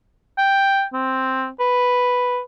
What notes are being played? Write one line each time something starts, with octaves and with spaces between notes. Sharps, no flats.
G5
C4
B4